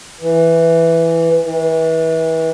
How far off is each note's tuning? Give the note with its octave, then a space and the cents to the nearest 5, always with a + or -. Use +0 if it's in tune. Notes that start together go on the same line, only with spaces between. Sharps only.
E3 +5
E3 -30